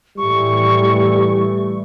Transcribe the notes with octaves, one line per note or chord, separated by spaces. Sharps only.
A2 E3 G3 A3 C#6